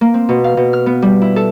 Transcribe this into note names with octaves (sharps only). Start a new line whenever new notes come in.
A#3
C4
B2
F5
B2
F6
B3
G3
E4
A4